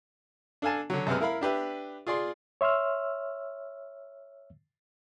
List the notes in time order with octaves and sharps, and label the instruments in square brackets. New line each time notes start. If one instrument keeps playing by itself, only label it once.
[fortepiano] D4 A4 F5 G#5 A5
D3 F#3
F#2 C3 G#3 B3 F6
E4 A#4 F5 B5
D4 G4 B4 E5
F4 G#4 D5 C6
[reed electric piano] C#5 E5 C6 E6 F6